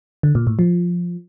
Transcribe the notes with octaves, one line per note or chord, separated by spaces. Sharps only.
D3
A#2
A2
F3